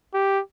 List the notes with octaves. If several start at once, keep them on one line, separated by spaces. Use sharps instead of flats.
G4